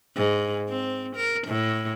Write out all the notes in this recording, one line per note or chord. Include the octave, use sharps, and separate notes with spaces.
G#2
C4
A#4
A2